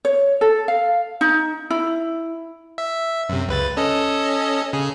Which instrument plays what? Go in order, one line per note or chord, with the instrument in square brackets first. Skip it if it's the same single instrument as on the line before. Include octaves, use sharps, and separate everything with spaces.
[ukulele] C#5
A4
F5
D#4
E4
[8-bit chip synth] E5
F#2 C3
C#2 B4 A6
C#4 A4 D#5
C#3 G#4